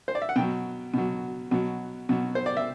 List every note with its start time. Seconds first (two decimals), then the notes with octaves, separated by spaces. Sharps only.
0.08 C5
0.15 D5
0.22 E5
0.29 F#5
0.36 B2 F#3 G5
0.94 B2 F#3
1.51 B2 F#3
2.09 B2 F#3
2.35 C5
2.46 D5
2.57 E5